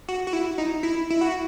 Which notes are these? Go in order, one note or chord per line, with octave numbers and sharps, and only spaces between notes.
F#4
F#4
E4
D#4
E4
E4
F#4